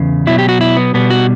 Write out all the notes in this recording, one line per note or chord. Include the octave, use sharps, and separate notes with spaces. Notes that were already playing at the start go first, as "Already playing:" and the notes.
Already playing: E2 C#3
B2 F#3 E4
G4
F#4
E4
B3
B2 G3 B3
F#4